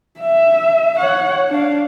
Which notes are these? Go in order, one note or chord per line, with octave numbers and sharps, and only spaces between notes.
E5
C#5 F#5
D4 F5